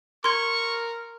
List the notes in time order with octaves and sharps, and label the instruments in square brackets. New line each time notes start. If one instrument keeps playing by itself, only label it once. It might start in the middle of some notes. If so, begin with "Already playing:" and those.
[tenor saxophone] A#4 [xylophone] C6 G#6 [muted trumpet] C#6